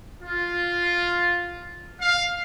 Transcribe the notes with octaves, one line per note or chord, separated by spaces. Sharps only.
F4
F5